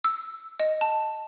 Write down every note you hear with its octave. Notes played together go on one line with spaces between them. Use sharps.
E6
D#5
A5